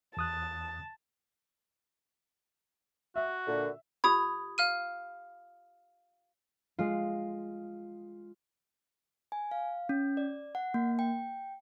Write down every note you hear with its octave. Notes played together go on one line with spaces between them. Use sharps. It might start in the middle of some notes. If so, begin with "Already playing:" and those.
E2 A5 D#6 F#6
F#4 E5
A#2 D3
F4 G4 B5 D#6 G#6
F5 F6 D#7
G#3 F4
G#5
F5
C#4
D5
F#5
A#3
G5